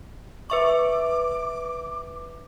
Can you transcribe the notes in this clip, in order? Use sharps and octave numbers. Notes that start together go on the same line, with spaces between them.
B4 E5 C#6 D6